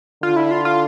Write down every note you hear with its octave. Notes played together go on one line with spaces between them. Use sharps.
D3 F4
E4
F4
F4